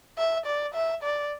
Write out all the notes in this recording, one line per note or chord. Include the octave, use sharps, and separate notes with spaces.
E5
D5
E5
D5